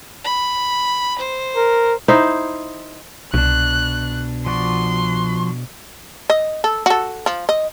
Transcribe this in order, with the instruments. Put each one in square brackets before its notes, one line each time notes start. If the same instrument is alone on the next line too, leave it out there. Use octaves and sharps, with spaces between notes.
[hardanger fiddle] B5
C5
[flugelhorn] A#4
[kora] D#4 E4 C5
[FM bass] C2 [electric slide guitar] B2 D4 [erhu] F#6
[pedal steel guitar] F3 F#4 D5 [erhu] C6
[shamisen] D#5
A4
F#4 A4
F3
D#5